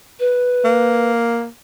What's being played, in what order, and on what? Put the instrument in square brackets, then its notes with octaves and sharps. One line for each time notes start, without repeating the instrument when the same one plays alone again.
[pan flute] B4
[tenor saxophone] A#3